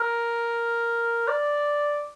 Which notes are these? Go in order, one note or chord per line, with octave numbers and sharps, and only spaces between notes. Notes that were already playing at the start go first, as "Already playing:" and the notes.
Already playing: A#4
D5